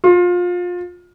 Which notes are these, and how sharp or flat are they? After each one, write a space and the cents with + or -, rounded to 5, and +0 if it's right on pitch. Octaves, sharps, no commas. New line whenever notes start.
F4 +25